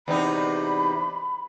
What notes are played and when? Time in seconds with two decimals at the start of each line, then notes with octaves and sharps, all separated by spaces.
0.08 E2 C3 D#4 B5